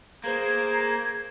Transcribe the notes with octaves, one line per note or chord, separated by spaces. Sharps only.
A#3 G#4 C5 A#5 G#6